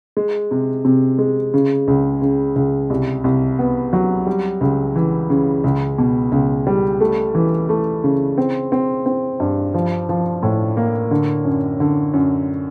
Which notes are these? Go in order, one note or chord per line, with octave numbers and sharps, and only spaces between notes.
G#3
C3
C3
G#3
C#3
C#2
C#3
C#2
C2
C2
B3
F#3
G3
C#2
E3
C#3
C#2
B2
C#2
G3
A3
E3
A3
C#3
C4
C4
C4
G2
F3
F3
A2
A#3
D3
F#2
D3
F#2